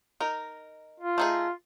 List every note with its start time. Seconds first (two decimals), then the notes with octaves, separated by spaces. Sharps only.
0.20 D#4 A#4
1.00 F4
1.18 A3 D#4 G#4